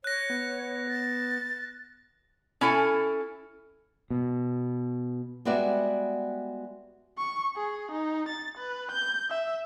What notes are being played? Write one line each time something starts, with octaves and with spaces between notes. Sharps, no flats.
C#5 F#6 A#6
B3
A6
C#4 E4 A4 G#5
B2
G3 G#3 B3 F#4 D5 E5
C#6
G#4
D#4
A6
B4
G6
E5